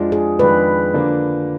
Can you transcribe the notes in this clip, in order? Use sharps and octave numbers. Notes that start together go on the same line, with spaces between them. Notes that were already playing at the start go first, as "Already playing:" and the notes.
Already playing: F2 F3 G#3 D4 F4
G#4
F2 D#3 G#3 D4 F4 B4
D3 F3 A#3 D4